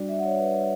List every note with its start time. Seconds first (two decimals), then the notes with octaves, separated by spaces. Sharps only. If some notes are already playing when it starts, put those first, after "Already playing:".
Already playing: G3 D4 F#4 D5
0.09 E5
0.19 F#5
0.25 C#5
0.29 D5
0.39 B4